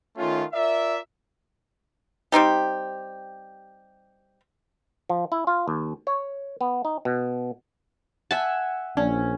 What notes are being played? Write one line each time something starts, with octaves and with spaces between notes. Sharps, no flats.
D#3 A3 C#4 F4
F4 A#4 D5 E5
G3 C4 D#4 G4
F3
E4
F4
D#2
C#5
B3
D#4
B2
E5 F#5 G#5 A5
A#1 C#4 D4